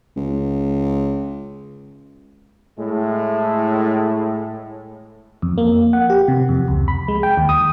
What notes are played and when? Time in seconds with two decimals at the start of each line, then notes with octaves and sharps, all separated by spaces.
0.16 C#2
2.78 A2 G#3
5.42 F2
5.58 A#3
5.93 F#5
6.10 G4
6.28 C3
6.49 F2
6.68 C#2
6.88 B5
7.08 G#3
7.23 G5
7.37 D#2
7.49 D#6